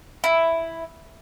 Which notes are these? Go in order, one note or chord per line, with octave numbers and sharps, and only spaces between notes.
E4